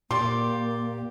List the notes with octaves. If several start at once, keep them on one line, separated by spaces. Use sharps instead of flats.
A#2 A#3 G4 C5 D5 C6